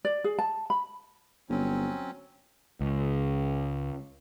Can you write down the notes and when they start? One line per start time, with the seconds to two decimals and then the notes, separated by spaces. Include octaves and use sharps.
0.05 D5
0.24 G#4
0.39 A5
0.70 B5
1.50 G1 F#3 C4 C#4
2.81 C#2